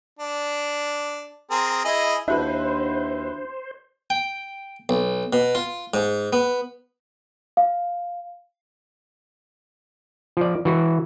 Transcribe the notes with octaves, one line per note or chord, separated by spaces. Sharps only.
D4
C4 G#4 A#4
E4 G#4 D#5
D#2 D4 E4 F#4 B4 C5
G5
B1
B2
F4
G#2
B3
F5
F3 D5
E3 F#4